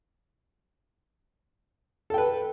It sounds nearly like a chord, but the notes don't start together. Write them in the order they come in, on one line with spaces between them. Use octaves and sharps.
A4 G5 B4